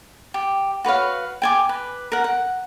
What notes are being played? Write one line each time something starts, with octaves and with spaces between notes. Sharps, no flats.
G4
F#4 B4 C#5 F5
G5 G#5 D6
B4
A#4 F#5
F#5